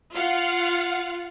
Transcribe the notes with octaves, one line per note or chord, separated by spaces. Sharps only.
F4 F5 F#5